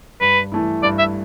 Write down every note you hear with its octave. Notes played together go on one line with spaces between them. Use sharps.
G2 B4
E3 A3 E4
G2 D5
E5